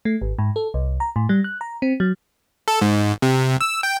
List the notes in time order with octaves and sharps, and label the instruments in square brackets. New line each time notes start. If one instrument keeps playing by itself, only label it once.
[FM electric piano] A3
G#1
G#2
A4
C2
A#5
A2
G3
F#6
A#5
C4
F#3
[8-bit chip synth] A4
G#2
C3
E6
G5